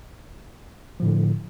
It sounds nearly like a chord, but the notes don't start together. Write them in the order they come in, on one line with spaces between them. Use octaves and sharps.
F3 A2 D3